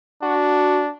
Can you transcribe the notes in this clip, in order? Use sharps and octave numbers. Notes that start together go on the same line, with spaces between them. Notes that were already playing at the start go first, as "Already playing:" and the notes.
D4 F#4